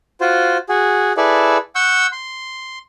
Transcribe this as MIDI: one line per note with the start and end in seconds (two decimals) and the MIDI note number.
0.21 0.57 65
0.21 0.57 66
0.21 0.57 72
0.69 1.13 66
0.69 1.13 68
1.17 1.58 64
1.17 1.58 68
1.17 1.58 69
1.17 1.58 71
1.17 1.58 74
1.75 2.07 78
1.75 2.07 85
1.75 2.07 88
1.75 2.07 91
2.12 2.79 84